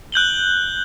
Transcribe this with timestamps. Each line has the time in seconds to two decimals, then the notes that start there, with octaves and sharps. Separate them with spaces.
0.12 F#6 G6 F#7 G7